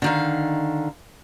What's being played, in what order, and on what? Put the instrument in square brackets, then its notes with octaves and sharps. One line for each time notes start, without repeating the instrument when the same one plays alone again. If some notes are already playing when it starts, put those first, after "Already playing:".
[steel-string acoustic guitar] D3 D#3 F5